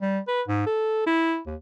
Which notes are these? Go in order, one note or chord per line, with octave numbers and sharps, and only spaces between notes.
G3
B4
G#2
A4
E4
D#2